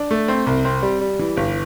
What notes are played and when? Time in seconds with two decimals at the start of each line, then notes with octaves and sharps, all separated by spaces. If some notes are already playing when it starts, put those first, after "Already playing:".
Already playing: D4
0.11 A3
0.28 C4
0.47 C2
0.65 C4
0.82 G3
1.01 G3
1.19 E3
1.37 G1